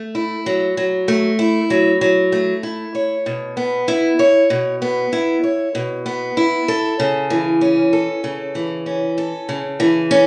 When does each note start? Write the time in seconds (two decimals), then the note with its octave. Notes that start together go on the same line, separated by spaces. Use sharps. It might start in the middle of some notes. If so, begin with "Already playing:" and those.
Already playing: A3
0.15 E4
0.46 F#3
0.77 F#3
1.08 A3
1.39 E4
1.70 F#3
2.01 F#3
2.32 A3
2.63 E4
2.95 C#5
3.26 B2
3.57 B3
3.88 E4
4.19 C#5
4.50 B2
4.82 B3
5.13 E4
5.43 C#5
5.75 B2
6.06 B3
6.37 E4
6.68 A4
7.00 C#3
7.30 E3
7.61 C#4
7.93 A4
8.24 C#3
8.55 E3
8.86 C#4
9.18 A4
9.49 C#3
9.80 E3
10.11 C#4